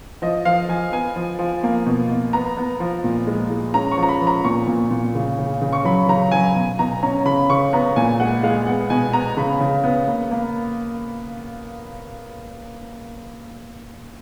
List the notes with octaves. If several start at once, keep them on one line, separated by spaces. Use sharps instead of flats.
F3 D#5
F3 F5
F3 G#5
B3 G#5
F3
F3
A#3
B2
B2
B3 A#5
B3
F3
A#2
G#3
G#3
C#4 A#5
C#6
F3
A#5
B5
F3
A#5
A#2 C#6
A#2
A#2
C#3
C#3
C#3
C#6
F#3 B5
C#3 A#5
F#3 G#5
B2
B2 A#5
C#4 A#5
C#3 B5
C#3 C#6
B3 A#5
A#2 G#5
G#3 F#5
G#3 F5
B3 F#5
B2 G#5
B3 A#5
C#3 B5
C#3
B3
A#3
A#3